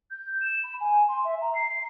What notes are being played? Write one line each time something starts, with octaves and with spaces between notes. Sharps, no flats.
G6
E7
B5
G#5
C6
E5
A#5
C7